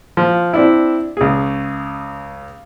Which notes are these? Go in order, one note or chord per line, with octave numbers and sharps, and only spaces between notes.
F3
C4 D4 E4
C#2 G#4